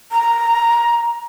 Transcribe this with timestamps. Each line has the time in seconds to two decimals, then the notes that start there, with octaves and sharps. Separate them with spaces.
0.12 A#5